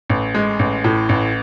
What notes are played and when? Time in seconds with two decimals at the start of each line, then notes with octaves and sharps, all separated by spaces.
0.10 A1
0.35 G#3
0.59 A1
0.84 A2
1.09 A1